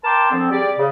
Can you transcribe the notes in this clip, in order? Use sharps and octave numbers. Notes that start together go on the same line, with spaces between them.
A#4 G5 A5 C6 D6
D3 F3 C4
G3 G4 G#4 D5
C#3